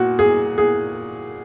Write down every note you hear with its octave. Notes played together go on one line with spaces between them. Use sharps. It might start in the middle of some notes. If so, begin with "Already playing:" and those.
Already playing: A#2 F#4
G#4
G#4